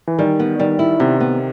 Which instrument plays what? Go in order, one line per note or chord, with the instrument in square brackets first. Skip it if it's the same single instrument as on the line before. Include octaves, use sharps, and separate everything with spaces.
[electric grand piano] E3
[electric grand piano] D#3 [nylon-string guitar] G3
[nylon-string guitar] B3
[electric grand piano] D#3 [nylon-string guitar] G3
[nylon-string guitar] E4
[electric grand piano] C3 [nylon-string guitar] B3
[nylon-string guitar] B3